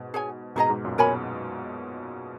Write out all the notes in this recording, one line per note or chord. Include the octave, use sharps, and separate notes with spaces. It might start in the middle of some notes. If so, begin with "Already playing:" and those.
Already playing: G#2 B2
G#4 C#5 G#5
G#2 B2 D#4 G#4 D#5 A#5
G#2 B2
F#2 A#2
B2 A#4 C#5 G#5 B5